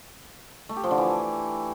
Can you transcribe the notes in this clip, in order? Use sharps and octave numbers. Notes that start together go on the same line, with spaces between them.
A3
G4
F3
D3
E3